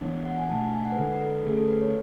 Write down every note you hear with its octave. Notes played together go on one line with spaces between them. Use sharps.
E3 B3 D4 C#5
F#5
G#5
B2 A3 D4 A5
A5
G#5
F#5
B4
D3 G#3 D4 A4
B4
A4
D3 A3 C#4 G#4
A4
B4
C#5